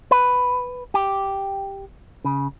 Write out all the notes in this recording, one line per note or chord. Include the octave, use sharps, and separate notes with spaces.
B4
G4
C#3